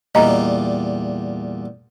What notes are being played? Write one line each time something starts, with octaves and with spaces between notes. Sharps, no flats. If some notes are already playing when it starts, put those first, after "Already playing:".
E2 A#2 G3 D#5 A#5